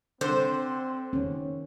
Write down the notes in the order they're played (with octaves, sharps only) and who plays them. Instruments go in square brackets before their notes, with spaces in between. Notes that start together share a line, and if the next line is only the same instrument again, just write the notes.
[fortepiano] D3 [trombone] C4 [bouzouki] C5
[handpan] D#3 C#4